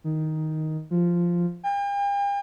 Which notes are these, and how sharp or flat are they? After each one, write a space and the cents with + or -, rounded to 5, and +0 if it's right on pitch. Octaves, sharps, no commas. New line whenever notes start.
D#3 +5
F3 -5
G5 +45